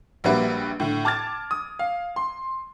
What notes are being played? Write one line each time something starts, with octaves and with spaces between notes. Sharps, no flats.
A#1 G3 A#3 F#4 B4 E5
A2 D3
A5 D6 F6 G#6 A6
D#6
F5
C6